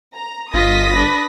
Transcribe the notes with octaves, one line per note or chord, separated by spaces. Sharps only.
A#5
G1 F4 D#5 D#6 A#6 B6
D4 B4